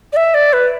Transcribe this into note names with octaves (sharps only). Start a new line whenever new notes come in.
D5
E5
D5
B4